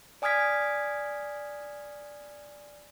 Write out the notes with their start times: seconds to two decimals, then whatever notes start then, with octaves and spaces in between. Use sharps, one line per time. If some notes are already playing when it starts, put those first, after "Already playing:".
0.22 D5 G#5 D#6 F6 G#6 B6